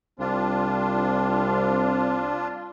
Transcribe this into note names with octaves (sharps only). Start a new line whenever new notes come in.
C2 C4 D4 F4